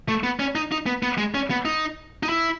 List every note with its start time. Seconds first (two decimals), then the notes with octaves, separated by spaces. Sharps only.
0.08 A3
0.23 B3
0.40 C#4
0.55 D#4
0.72 D#4
0.86 B3
1.03 B3
1.18 G#3
1.35 C#4
1.50 B3
1.65 D#4
2.23 D#4
2.29 E4